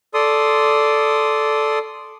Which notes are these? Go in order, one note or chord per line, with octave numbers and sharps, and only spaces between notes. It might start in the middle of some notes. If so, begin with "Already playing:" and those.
A4 D5 C6 D#6